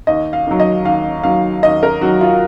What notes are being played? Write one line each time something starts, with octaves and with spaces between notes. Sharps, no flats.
D#2 D#5
F5
D#3 F#3
D#5
D#2 F5
D#3 F#3 F5
D#2 D#5
A#4
D#3 F#3 F#4
F4